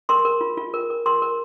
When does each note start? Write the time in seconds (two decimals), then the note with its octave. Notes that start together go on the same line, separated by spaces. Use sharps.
0.09 A#4 C6
0.25 A#4
0.41 F4
0.57 F4
0.74 A#4
0.90 A#4
1.06 A#4 C6
1.22 A#4